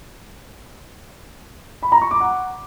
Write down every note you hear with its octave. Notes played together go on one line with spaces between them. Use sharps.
B5
A#5
C#6
D6
F#5